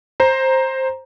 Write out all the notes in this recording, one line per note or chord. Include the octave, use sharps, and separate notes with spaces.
C5 A#5